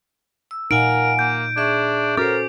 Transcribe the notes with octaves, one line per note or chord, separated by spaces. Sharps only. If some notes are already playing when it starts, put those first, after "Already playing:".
E6
A#2 D#4 A#4 F5 F#5 G#5 D7
A#3 G6
D4 G#4 E5 C#6
C#4 F#4 A4 A#4 C5 D6